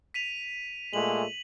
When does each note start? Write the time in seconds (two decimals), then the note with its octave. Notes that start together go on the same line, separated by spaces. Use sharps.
0.14 B6 D#7 F7
0.93 A#2 G#3 A3 F#7